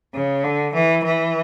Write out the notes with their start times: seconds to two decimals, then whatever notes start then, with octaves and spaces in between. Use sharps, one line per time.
0.14 C#3
0.44 D3
0.74 E3
1.04 E3